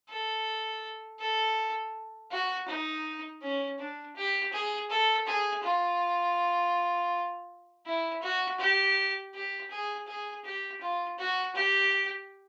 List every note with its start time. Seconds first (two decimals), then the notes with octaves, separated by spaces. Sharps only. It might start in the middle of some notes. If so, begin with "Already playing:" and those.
0.09 A4
1.19 A4
2.31 F#4
2.68 D#4
3.42 C#4
3.78 D4
4.16 G4
4.53 G#4
4.90 A4
5.27 G#4
5.64 F4
7.86 E4
8.22 F#4
8.59 G4
9.34 G4
9.70 G#4
10.07 G#4
10.45 G4
10.81 F4
11.18 F#4
11.55 G4